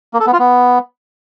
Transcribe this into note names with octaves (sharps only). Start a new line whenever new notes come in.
A#3
A4
B3
F4
B3